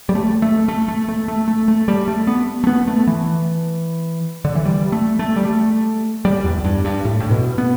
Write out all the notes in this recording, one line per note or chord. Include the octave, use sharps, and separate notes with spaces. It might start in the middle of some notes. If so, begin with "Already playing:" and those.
G3
A3
A3
A3
A3
A3
A3
A3
A3
G3
A3
B3
A3
B3
A3
E3
D3
E3
G3
A3
A3
G3
A3
G3
E2
G2
G2
A2
A2
B2
B3